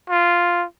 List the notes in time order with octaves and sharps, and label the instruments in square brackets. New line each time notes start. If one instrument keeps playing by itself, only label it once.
[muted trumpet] F4